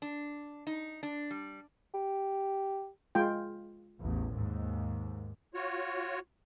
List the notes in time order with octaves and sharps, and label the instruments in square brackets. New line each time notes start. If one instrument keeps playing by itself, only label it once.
[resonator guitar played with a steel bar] D4
D#4
D4
G3
[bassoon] G4
[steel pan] G#3 F4 G5
[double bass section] A1 E2
D#2 G#2
[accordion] F4 F#4 C#5